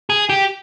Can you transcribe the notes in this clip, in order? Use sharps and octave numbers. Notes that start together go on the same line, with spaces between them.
G#4
G4